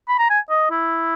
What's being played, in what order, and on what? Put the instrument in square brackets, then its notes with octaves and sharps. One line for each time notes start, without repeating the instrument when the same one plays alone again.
[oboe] B5
A#5
G#5
D#5
E4